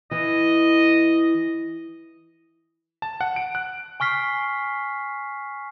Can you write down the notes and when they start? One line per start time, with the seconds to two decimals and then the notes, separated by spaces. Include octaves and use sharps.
0.11 E3 D#5
3.02 A5
3.21 F#5
3.36 D7
3.55 F#6
4.00 G#5 C#6 F6 B6 C7